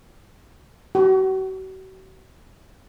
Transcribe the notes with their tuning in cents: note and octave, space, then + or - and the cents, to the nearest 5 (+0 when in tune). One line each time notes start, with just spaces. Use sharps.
F#4 +40